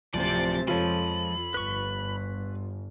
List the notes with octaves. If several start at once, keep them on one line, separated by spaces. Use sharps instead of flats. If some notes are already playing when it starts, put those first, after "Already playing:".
D1 C3 F3 C5 D5 A6
F2 F3 G#3 F4 A4 C#5 B5
G1 B4 C#6